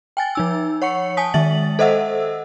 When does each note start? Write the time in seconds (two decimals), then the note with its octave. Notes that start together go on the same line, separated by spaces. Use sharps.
0.17 G5 G#5 A6
0.35 F3 D#4 E6
0.82 C#5 F#5 C#6 C#7
1.17 G#5 A5 D#6 B6
1.34 D#3 G#3 E5 A6 F#7
1.79 A4 C5 D#5 E5 F#5 E6